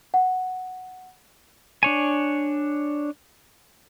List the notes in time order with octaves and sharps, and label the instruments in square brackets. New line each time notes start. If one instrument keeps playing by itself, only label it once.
[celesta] F#5
[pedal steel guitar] D4 C#5 G#5